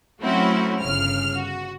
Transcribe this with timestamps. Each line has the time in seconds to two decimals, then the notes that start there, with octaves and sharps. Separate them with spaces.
0.23 F#3 A3 C4 C#4 E4 F#4
0.82 G1 C#3 F6
1.36 F#4